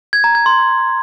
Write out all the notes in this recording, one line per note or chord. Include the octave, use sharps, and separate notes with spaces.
G#6
A#5
G#6
C6